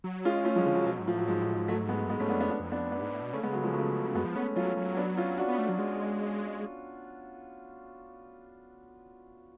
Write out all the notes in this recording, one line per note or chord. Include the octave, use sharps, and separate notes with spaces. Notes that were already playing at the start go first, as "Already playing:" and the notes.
F#3
G#3 C#4 F4
A3 C#4 F4
F3 F#3 G#3
D3 F3
C#3 F#3
B2 F#3
G#2 F#3
A2 F3
F#3
G#2 F3 G#3
A2
G#2
F#3 A3
G#3 B3
F#2
G#2 G#3 B3
G#2 A3 C#4
F#2 B3 D4
F2 B3 D4
B3 D4
F2
B3 D4
F#2 B3 D4
G#2
A2
B2
C#3 A3 C#4
G#3 B3
F#3 A3
F3 G#3
F#3 A3
F#2 G#3 B3
F3
A3 B3 C#4
F#3 C#4 F4
F#3
B3 D4
C#4 F4
D4 F#4
B3
A3
F#3
G#3